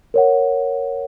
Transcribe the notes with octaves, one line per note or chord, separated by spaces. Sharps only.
A#4 C#5 F#5